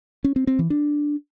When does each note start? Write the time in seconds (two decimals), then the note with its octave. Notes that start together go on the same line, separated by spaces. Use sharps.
0.24 C#4
0.36 C4
0.47 C4
0.59 E3
0.70 D4